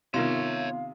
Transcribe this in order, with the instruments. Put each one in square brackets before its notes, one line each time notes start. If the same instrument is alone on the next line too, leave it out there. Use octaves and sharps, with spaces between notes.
[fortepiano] C3 D#3 [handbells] B3 F4 C6 [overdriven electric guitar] C#5 E5 [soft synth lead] F5